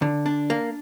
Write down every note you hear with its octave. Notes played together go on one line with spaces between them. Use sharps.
D3
D4
A#3